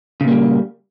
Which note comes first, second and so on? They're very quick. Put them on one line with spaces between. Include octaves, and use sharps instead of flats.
C#3 A#2 A#3 G3